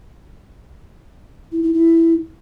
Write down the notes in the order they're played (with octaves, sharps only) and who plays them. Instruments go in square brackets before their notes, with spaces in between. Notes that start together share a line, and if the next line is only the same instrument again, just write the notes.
[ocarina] E4
E4
E4